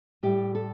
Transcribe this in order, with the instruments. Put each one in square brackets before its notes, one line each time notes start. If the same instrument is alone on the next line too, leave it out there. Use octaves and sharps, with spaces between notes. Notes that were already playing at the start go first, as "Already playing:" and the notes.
[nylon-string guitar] A2 G3 G4
A4